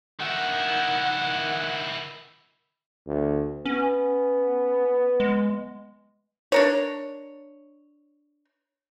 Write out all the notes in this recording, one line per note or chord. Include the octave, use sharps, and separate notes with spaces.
D#3 E4 F#5
D2
B3 C#4
G#3
D4 A#4 C#5